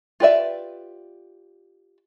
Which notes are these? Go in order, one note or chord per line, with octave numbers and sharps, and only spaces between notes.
F4 G4 B4 D5 E5